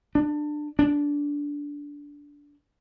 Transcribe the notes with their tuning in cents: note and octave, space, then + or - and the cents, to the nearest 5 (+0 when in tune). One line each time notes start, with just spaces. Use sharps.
D4 +20
D4 -15